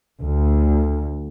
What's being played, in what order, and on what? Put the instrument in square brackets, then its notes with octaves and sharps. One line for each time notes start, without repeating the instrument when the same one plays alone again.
[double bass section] D2